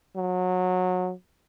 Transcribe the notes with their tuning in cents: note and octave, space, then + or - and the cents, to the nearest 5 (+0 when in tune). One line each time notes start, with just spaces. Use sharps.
F#3 -20